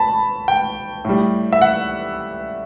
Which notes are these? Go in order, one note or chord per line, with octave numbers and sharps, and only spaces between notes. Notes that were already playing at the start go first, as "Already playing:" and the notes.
Already playing: A5 B5
G5
A2 G3
E5
F#5